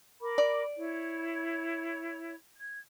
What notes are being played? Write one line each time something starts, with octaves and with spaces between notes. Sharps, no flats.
A#4 B5 D6
D5
E4 C#5
G#6